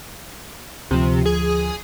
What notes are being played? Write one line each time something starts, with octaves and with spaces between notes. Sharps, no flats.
D2 C3 F3
G#4